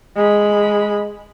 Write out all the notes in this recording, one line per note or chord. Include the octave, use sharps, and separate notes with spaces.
G#3 B5